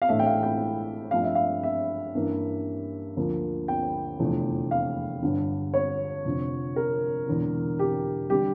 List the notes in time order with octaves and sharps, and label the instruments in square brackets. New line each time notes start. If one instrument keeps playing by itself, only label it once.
[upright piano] F5
A1 A2 E3 A3 D4 E5
G5
F5
G5
G2 F3 A3 D4 F5
E5
F5
E5
G2 E3 A#3 C#4
D2 D3 F3 A#3
G5
F1 E2 D3 F3 A3
F5
G1 G2 D3
C#5
F1 F2 D3
A#4
E1 E2 D3
G4
D3 G3 G4